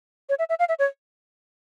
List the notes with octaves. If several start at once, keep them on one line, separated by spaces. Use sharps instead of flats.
C#5
E5
E5
F5
E5
C#5